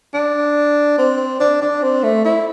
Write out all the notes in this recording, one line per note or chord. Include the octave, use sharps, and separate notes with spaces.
D4
C4
D4
D4
C4
A3
E4